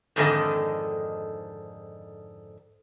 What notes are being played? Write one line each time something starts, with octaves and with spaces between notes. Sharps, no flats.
F2 G#2 D3 D#3 A4 D#5